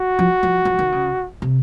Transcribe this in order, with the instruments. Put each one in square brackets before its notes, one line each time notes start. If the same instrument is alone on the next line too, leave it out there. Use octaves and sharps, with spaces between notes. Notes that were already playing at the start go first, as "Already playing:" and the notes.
Already playing: [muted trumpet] F#4
[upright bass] F3
F3
F3
D#3
C#3
C3